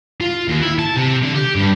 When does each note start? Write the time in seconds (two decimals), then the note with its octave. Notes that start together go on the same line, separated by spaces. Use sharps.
0.21 F4
0.48 D#2
0.61 E4
0.79 A5
0.96 C3
1.23 D3
1.35 G4
1.56 G2